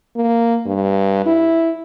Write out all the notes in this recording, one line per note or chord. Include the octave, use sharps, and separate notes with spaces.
A#3
G2
E4